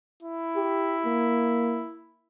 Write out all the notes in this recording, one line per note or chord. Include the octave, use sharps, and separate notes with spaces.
E4
G4
A#3